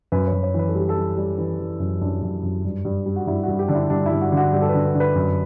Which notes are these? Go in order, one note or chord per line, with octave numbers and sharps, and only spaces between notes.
F#2 B4
C#5
F#2
C#5
E3 B4
A4
G3 G4
A4
G3
G3
E3
E3
F#2
F#2 D4
F#2
F#2
G2
G2
G3
F#4
G2 E4
G2 F#4
G4
D3 D4
E4
G2 D4
E4
G2
F#4
D3 F#4
G2 G4
A4
B4
D3
B4
D3
B4
F#2